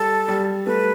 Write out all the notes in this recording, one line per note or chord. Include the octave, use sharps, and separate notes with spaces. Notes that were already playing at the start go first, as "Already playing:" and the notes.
Already playing: G3 A4
G3
A3 B4